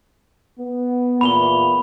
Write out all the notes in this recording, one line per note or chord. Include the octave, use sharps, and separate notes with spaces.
B3
E2 A#2 B5 F7 G7